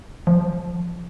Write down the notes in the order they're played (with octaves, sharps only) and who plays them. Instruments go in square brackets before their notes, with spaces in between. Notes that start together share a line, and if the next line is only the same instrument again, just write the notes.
[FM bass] F3